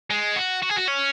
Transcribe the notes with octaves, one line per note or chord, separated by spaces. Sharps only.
G#3
F#4
F#4
G#4
F#4
C#4